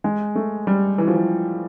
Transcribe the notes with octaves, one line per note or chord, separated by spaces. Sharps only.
G#3
A3
G3
E3
F3
E3